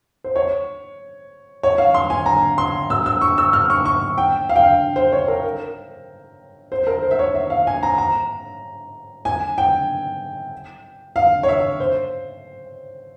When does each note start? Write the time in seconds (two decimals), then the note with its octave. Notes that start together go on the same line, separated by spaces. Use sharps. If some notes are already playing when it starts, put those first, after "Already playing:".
0.24 C5
0.36 C#5
1.63 C#5
1.78 F5
1.94 C6
2.10 G#5
2.26 A#5
2.58 C6
2.90 E6
3.06 E6
3.21 C#6
3.38 E6
3.53 F6
3.70 C#6
3.85 C#6
4.18 G5
4.49 F5
4.56 G5
4.63 F5
4.96 C5
5.12 C#5
5.28 A#4
5.44 A#4
6.72 C5
6.87 A#4
7.03 C5
7.11 E5
7.19 C#5
7.35 E5
7.50 F5
7.67 G#5
7.83 A#5
7.98 A#5
9.25 G#5
9.58 G5
11.16 F5
11.43 C#5
11.48 E5
11.80 C5